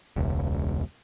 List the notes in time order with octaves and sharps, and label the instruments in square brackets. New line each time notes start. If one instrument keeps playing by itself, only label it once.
[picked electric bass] E1 C#2